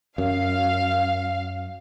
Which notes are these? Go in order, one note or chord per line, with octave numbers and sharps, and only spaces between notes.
F#2 F5